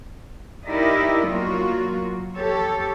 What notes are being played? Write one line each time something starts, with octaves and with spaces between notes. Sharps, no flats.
D#4 E4 G4 A#4 D5 D#5
F#3 A#3 F4 F#4
G4 A4 C#5